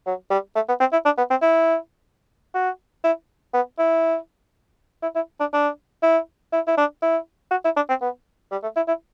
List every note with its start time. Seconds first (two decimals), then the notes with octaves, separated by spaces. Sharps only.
0.06 F#3
0.30 G3
0.55 A3
0.68 B3
0.80 C4
0.92 E4
1.05 D4
1.18 B3
1.30 C4
1.42 E4
2.55 F#4
3.04 E4
3.53 B3
3.79 E4
5.02 E4
5.15 E4
5.40 D4
5.53 D4
6.03 E4
6.52 E4
6.67 E4
6.77 D4
7.02 E4
7.51 F#4
7.65 E4
7.76 D4
7.89 C4
8.01 B3
8.52 G3
8.63 A3
8.76 E4
8.88 E4